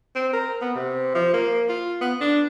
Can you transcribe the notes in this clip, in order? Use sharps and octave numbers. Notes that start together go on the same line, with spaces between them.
C4
A#4
B3
C3
F3
A#3
F4
B3
D4